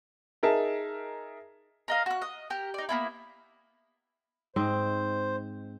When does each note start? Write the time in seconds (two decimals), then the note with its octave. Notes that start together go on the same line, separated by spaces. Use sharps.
0.43 D#4 G#4 A#4 E5 A5
1.88 A#4 D#5 F5
2.06 F#4 F#6
2.22 D#5
2.50 G4 A#4
2.74 D#4 D5
2.89 A#3 B3 E4
4.56 G#2 C4 C5 D#5